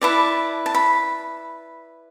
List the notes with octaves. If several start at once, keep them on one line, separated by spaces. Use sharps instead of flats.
E4 B4 D5 A5
A5
B5